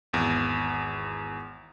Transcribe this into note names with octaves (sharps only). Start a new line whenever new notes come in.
G#1 E2